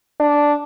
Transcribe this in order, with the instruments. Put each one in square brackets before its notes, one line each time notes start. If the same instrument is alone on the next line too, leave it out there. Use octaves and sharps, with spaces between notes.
[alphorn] D4